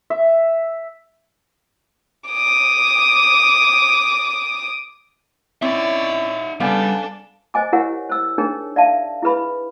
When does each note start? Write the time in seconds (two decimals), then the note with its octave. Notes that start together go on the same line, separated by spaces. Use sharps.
0.10 E5
2.29 D6 D#6
5.62 C4 C#4 D#4 E4 C#5 D5 E5
6.60 C#3 G3 B3 D4 A4 F5 G#5
7.54 C5 D#5 G#5 D6
7.73 E4 G4 A#4 C#5 F#5
8.10 C5 E6
8.38 D4 D#4 G#4 A#4 C#5
8.76 D5 E5 F5 A5
9.22 E4 G#4 B4 B5